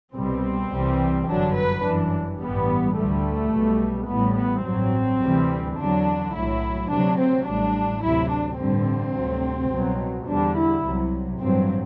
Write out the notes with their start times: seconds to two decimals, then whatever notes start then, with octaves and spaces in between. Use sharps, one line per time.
0.15 C2 B2 G3 C4
0.71 C2 C3 E3 G3
1.27 G1 F#2 D3 F#3 D4
1.56 B4
1.84 G1 F#2 E3 D4
2.40 A1 G2 E3 G3 B3
2.96 D2 D3 G3 A3
3.52 B1 B2 G3
4.09 A1 A2 G3 B3
4.37 B3
4.65 A1 G2 F#3 C4
5.21 D2 C3 E3 G3
5.77 E2 D3 F#3 D4
6.34 B1 A2 F#3 E4
6.89 D2 C3 F#3 D4
7.18 C4
7.46 A1 A2 G3 D4
8.02 D2 C3 F#3 E4
8.30 D4
8.58 A1 G2 D3 G3 C4
9.14 D2 C3 F#3
9.71 C2 B2 F#3
10.27 E2 D3 G3 D4
10.55 E4
10.83 C2 C3 F#3
11.39 A1 G2 F#3 C4